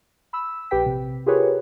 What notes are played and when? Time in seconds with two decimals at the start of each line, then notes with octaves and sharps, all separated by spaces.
0.33 B5 E6
0.71 A#1 G4 B4 G5 B6
0.86 C3
1.26 F4 G4 G#4 A#4 B4 C#5